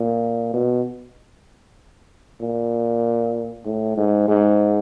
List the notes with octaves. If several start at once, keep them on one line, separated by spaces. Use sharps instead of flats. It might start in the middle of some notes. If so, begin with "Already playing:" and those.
Already playing: A#2
B2
A#2
A2
G#2
G#2